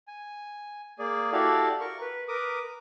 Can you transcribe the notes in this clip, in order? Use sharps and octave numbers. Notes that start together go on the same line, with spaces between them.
G#5
A#3 G#4 D5
E4 F#4 G4 A4 D5 F5
A#4 C#6
B4
A#4 B4 D6 D#6